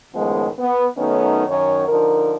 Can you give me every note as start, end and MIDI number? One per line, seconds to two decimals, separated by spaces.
0.14 0.47 42
0.14 0.47 45
0.14 0.47 51
0.14 0.47 53
0.14 0.47 56
0.14 0.47 59
0.59 0.86 59
0.98 1.46 51
0.98 1.46 54
0.98 1.46 57
0.98 1.46 59
0.98 1.46 61
0.98 1.46 63
1.48 1.86 42
1.48 1.86 51
1.48 1.86 73
1.88 2.36 50
1.88 2.36 53
1.88 2.36 63
1.88 2.36 70